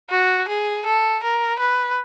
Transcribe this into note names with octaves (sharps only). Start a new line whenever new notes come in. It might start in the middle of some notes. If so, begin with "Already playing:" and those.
F#4
G#4
A4
A#4
B4